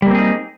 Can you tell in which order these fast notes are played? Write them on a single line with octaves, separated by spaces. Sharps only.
G3 A#3 C4 G#4 D#4